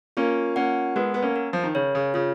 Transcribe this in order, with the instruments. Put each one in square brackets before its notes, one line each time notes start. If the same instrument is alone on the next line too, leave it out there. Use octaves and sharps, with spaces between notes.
[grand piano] A#3 C#4 [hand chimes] F4
[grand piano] A#3 C#4 [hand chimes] F#5
[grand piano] G#3 B3 [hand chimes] A#4
[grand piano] B3
A#3 C#4
[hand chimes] A#4
[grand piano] F3
D#3
[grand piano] C#3 [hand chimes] C#5
[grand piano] C#3
[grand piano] C#3 [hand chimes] F4